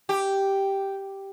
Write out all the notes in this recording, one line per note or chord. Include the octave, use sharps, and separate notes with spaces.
G4